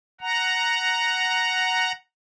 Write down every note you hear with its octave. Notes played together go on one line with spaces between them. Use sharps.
F#5 A#5